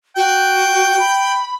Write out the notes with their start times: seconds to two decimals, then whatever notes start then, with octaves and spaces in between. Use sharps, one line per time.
0.17 F#4 G5
0.99 B5